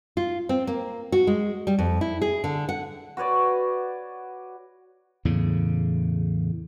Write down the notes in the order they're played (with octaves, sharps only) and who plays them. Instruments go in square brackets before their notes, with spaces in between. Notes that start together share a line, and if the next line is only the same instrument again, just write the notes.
[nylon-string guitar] F4
C4
A#3
F#4
G#3
G3
F2
E4
G#4
D3
F#5
[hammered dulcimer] F#4 B4 C#5 D5
[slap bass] E2 A2 C#3